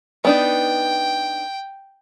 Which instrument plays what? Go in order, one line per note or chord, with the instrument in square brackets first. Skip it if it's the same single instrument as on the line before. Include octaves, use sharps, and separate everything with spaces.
[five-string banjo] B3 D4 D#4 [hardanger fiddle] G5